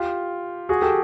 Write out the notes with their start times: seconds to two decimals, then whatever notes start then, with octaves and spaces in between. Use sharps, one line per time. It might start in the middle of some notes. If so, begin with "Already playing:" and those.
Already playing: F4 G4
0.69 F#4 G#4
0.82 G4 A4